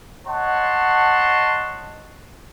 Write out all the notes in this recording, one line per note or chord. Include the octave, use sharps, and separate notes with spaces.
C#5 D#5 F#5 A5 C6